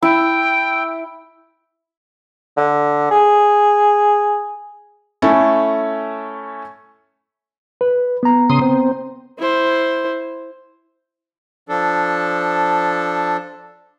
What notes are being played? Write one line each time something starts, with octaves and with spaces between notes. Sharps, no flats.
E4 G5
D3
G#4
A3 C#4 E4 A4
B4
B3 A#5
C#3 C6 D#6
C4
E4 C5
F3 D4 A4